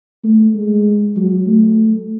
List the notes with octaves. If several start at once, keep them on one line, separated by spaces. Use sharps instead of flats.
A3
G#3
F#3
A3